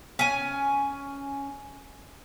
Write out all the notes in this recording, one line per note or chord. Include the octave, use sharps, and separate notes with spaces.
C#4 G#5